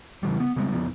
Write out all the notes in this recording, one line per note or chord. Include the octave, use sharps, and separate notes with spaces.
C#3 E3 G3
B3
C#3 G3 G#3 C4
F1 F3 B3